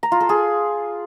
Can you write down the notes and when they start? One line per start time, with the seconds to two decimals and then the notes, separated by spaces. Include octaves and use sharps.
0.03 A#5
0.12 F4
0.20 A4
0.29 G#4